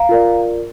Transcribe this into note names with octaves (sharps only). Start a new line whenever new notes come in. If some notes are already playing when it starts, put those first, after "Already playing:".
Already playing: F5 A#5
F4 A#4 D5